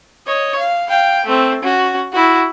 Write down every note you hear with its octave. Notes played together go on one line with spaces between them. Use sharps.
C#5 D#5
F5
F5 G5
A3 C4
C#4 F#4
E4 F#4